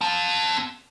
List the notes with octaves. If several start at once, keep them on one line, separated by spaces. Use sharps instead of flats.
C4 A5